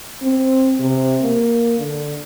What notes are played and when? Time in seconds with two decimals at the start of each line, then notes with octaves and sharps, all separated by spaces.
0.23 C4
0.80 C3
1.22 A#3
1.79 D3